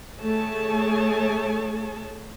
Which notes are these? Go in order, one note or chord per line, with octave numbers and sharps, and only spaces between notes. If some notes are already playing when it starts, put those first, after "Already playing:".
A3 G#4 C#5 A5